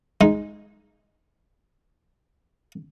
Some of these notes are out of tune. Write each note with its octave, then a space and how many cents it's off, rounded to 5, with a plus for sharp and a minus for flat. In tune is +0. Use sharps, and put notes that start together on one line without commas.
G#3 +0 D#4 +0